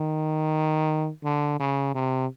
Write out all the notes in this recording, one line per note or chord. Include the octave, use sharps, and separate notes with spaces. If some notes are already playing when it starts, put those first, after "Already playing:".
Already playing: D#3
D3
C#3
C3